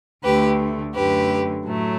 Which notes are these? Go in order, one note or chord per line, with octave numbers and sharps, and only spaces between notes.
D2 D3 A3 G4 B4
F#2 D3 A3 G4 B4
A2 F#3 A3